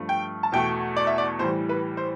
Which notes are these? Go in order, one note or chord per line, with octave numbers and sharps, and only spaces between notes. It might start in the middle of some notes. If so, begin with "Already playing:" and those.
Already playing: G2 F3 A3
G5
A5
E2 B2 A3 G5
D5
E5
D5
A2 E3 G3 C5
B4
C5